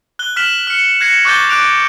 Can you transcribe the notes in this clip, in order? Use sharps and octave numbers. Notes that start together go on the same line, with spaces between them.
F#6 G7
F6 B6 E7 F#7
F6 C#7
F#6 G#6 A#6 C7 C#7 E7
C#6 D6 F#6 G6 A6 G7
D6 F#6 D7 F7